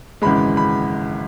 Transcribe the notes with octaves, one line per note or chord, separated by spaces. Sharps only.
G#1 F#2 C#3 E3 G#3 B5
B5